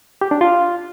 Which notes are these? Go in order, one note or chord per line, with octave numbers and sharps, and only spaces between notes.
G4
D4
F4